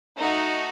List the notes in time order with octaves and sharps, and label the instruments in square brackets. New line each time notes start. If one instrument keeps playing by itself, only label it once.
[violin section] A3 D#4 F#4